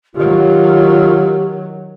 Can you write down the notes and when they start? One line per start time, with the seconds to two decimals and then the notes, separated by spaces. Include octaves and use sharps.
0.15 D#3 F#3 F4 G4